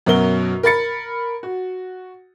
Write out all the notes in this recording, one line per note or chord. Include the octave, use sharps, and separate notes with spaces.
F#2 B2 F#3 F#4 A#4 G7
A#4 B5 A6 C#7
F#4